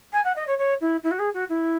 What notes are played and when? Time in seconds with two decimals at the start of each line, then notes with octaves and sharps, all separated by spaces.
0.12 G#5
0.24 F#5
0.35 D#5
0.47 C#5
0.58 C#5
0.80 E4
1.03 E4
1.10 F#4
1.18 G#4
1.33 F#4
1.49 E4